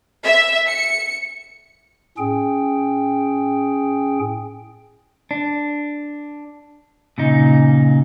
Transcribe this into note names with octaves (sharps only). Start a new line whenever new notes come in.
E5
C#7
A2 C#4 G#4 G5
D4
A#2 C#3 D#4